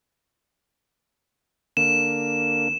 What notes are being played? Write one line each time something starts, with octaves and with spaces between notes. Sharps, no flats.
D3 A#3 E7